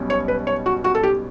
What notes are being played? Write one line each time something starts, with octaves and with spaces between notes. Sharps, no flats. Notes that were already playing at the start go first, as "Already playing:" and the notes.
Already playing: B1 B2 G3 C#4
C#5
B4
C#5
F#4
F#4
A4
G4